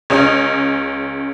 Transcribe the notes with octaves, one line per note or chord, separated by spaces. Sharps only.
C#2 C#4 D#5